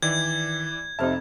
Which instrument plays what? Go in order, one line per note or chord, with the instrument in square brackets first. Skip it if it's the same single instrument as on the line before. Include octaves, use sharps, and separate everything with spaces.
[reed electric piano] D#3 [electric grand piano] E3 D5 E5 [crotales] G#6
[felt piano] F1 C3 D#4 [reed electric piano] C5 E5 [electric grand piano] A5 F6